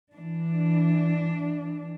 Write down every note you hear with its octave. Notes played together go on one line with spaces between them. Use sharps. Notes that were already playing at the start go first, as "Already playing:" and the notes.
E3 D4